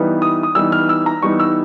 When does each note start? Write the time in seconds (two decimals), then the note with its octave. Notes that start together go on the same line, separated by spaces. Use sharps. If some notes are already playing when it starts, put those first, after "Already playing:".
Already playing: E3 G3 B3 D#4
0.22 D#6
0.43 D#6
0.55 E3 G3 B3 D#4 E6
0.72 F6
0.89 E6
1.06 A#5
1.22 E3 G3 B3 D#4 C#6
1.40 E6